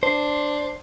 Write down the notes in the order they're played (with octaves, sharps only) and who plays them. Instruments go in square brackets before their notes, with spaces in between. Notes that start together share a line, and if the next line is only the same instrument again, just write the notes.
[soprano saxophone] D4 [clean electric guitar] C5